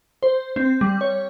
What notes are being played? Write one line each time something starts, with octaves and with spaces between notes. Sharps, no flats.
C5
C4
G3
C#5